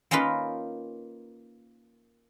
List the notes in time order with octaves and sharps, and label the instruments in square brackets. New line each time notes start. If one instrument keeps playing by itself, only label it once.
[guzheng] A#3 C#4 D#4 F4 B4